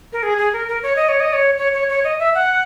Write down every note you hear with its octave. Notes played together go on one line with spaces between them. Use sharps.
A#4
G#4
G#4
A#4
A#4
C#5
D#5
C#5
D#5
C#5
C#5
C#5
C#5
D#5
E5
F#5